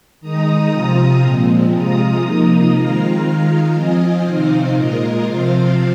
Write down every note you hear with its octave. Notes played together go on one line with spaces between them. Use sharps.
D#3 G#3 D#4 A#5 D#6
C3 F3 C4 F4
A#2 F3 G#3 C4
C3 G#3 F4 A#5 D#6
C3 F3 A#3 D#4 A#5 D#6
D#3 G#3 C4 F4 F5 A#5
D#3 G#3 F4
F3 C4 F4 D#5 G#5
C3 D#3 C4 D#4 C5 F5
A#2 G#3 F4 A#4 D#5
C3 F3 C4 F4 C5 F5